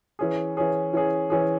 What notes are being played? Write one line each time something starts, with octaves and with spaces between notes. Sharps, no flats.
E3 C#4 G#4
E3 C#4 G#4
E3 C#4 G#4
E3 C#4 G#4